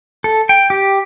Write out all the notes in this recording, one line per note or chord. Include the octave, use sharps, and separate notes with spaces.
A4
G5
G4